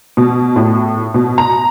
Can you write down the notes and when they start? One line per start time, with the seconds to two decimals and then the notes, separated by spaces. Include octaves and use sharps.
0.17 B2
0.56 A2
1.14 B2
1.38 A#5